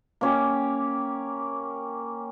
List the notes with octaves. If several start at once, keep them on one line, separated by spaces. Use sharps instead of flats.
A#3 C#4 G4